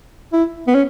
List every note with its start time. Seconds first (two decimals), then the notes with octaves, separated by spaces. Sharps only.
0.33 E4
0.67 B3
0.74 C#4